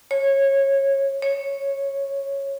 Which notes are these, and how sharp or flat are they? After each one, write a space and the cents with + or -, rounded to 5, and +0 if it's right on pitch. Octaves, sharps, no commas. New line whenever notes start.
C#5 -20
C#5 -10